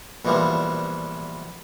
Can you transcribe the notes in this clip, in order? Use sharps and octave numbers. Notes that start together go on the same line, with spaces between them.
A#1 B2 E3 F3 G3